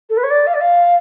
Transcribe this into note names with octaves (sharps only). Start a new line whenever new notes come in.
A4
B4
C#5
D5
F5
D5
F5